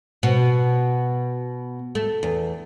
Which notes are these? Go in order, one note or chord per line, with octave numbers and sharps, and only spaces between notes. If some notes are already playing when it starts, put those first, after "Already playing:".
B2
A3
E2